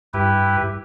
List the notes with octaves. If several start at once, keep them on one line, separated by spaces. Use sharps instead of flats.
G2 E4 G4 B4